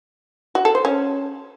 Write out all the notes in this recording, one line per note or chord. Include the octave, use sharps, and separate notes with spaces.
F#4
A4
C5
C#4